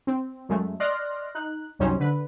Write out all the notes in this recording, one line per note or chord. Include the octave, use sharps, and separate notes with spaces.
C4
F#2 G#3 A3
D5 D#5 C6 F6 F#6 A#6
D#4 F#6
C2 F#2 G3 C#4 D#4 C5
D3 B4